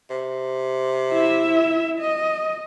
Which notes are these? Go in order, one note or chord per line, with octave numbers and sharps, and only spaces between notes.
C3
E4 E5
D#5